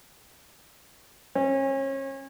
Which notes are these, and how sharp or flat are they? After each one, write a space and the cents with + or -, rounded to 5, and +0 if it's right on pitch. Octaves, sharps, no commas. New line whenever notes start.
C#4 -35